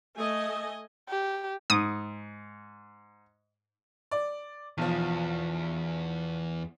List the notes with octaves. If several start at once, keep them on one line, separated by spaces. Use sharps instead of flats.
A3 D#5 G#5
G4
G#2 D#6
D5
B1 E2 F3